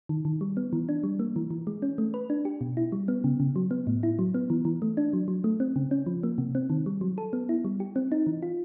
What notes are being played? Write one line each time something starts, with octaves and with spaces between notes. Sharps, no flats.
D#3
D#3
G3
B3
E3
D4
G3
A#3
E3
E3
G#3
C#4
A3
B4
D4
G4
B2
E4
G3
B3
C#3
C#3
F#3
B3
A2
E4
F#3
B3
E3
E3
A3
D4
F#3
F#3
A3
C4
C#3
C#4
F3
A#3
C3
C4
D#3
G3
F#3
A4
B3
E4
G3
G4
C4
D#4
E3
F4